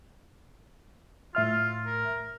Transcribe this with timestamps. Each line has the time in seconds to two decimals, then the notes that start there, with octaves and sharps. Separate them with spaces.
1.35 A2 F4 E5 F6
1.86 A#4